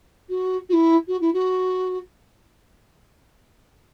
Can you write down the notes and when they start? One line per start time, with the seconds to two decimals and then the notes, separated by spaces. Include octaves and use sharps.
0.29 F#4
0.69 F#4
0.73 E4
1.07 F#4
1.21 E4
1.33 F#4